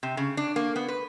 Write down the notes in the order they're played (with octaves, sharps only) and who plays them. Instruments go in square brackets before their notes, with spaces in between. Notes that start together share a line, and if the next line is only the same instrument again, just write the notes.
[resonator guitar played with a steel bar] C3
C#3
D4
A#3
B3
B4